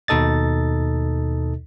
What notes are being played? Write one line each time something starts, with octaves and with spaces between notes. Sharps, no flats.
D#2 B2 D#4 A4 D#5 A6